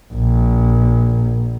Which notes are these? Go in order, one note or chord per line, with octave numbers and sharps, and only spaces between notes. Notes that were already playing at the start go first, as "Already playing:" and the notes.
A#1